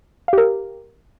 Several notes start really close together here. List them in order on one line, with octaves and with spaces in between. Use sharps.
F5 G4 A#4